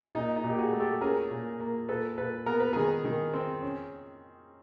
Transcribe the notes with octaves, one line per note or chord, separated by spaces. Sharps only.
A#2 D#4
D#4
A#2
G4
F#4 G#4
A3
G4 A4
C#4 G#4 A#4
A#2
A#3
A#2 A4 B4
A#2 A4 B4
B3 A#4
B4
D#3 G#4 A#4
D#3
C4
C#4